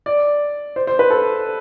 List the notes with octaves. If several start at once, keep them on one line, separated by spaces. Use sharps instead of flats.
D5
C5
C5
B4
A4